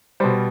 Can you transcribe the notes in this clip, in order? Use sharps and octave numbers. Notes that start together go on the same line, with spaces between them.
B2 G3 C5